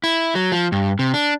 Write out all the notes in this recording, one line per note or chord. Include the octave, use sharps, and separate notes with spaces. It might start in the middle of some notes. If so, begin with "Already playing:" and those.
E4
F#3
F3
G2
C3
D4